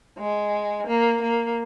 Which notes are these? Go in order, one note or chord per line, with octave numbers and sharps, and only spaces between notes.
G#3
A#3
A#3